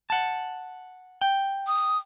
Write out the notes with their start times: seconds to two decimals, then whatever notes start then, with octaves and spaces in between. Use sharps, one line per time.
0.10 F#5 A5
1.21 G5
1.67 D#6